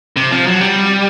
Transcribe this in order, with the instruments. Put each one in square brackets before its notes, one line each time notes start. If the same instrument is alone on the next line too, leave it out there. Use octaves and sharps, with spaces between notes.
[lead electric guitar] C3
F3
F#3
G3